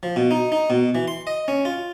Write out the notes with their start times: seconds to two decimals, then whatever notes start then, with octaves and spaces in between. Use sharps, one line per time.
0.03 F3
0.16 B2
0.31 D#4
0.52 D#4
0.70 B2
0.95 E3
1.08 C6
1.27 D#5
1.48 C#4
1.65 F4